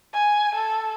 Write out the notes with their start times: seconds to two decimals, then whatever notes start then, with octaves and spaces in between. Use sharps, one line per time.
0.13 G#5
0.55 A4